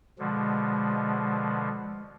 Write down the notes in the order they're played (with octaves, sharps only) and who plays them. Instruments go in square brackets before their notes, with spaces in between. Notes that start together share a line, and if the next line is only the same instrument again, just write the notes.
[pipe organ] B2 D3 F3 [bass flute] G#3